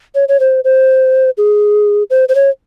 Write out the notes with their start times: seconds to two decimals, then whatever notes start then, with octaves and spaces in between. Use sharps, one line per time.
0.15 C#5
0.29 C#5
0.40 C5
0.64 C5
1.37 G#4
2.10 C5
2.29 C5
2.35 C#5